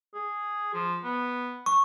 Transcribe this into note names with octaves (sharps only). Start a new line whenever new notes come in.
G#4
F3
B3
C#6